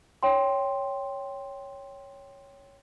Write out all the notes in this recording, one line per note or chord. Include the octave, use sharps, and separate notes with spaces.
C#5 G5 C6